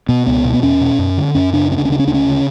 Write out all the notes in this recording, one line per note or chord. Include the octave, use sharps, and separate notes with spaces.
B2 B3
C#2 B3
B2
B3
E2 C#4
B2
F#2
D3
F#2 C#4
C#3 D4
D2 C#4
D4
C#4
C#3 D4
C#4
D2 D4
C#4
C#3